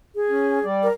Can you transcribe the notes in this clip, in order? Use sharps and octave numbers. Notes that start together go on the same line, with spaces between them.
G#4
C#4
G3 D5
A#4